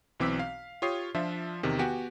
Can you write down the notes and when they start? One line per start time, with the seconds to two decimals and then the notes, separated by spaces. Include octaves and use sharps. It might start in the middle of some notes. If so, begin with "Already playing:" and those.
0.20 B1 E3 C4 D6 E6 B6
0.39 F5
0.82 F4 G4 C#5 D#6 C7
1.15 F3 D4 F4 E5
1.63 E2 C3 D#3
1.79 B3 F#4 G4 G#5